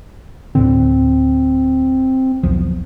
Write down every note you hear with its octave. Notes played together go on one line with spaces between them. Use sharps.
D2 A2 D3 C4
B1 E2 F3